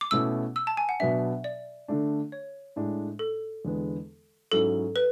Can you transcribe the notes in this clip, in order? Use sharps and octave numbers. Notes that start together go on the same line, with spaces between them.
D6
B2 A3 C#4 E4 E6
E6
A5
G#5
F#5
B2 F#3 B3 D4 E5
D5
D3 A3 D4
C#5
A2 G#3 D4
A4
E2 D3 G#3 B3
G#2 F#3 C#4 E4 A4
B4